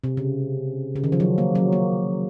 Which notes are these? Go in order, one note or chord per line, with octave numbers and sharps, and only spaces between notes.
C3
C#3
C#3
D#3
F3
F#3
A#3
F#3
A#3